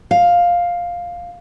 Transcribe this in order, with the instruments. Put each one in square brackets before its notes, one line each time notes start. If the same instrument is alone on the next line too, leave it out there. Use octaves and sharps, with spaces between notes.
[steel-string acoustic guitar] F5